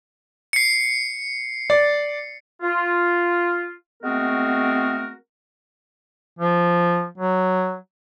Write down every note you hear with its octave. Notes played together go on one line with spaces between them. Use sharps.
C7 C#7
D5
F4
G#3 A3 B3 C4 F#4 A#4
F3
F#3